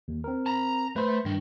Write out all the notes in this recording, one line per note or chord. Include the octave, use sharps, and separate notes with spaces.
D#2
C4 A#4
A5 A#5
A3 B4 C5
G2 D#3